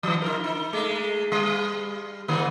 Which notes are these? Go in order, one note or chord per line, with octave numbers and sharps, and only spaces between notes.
E3 F3
D#4 F4 A#4
D#4
G#3 A3
G3
G#2 D#3 A#3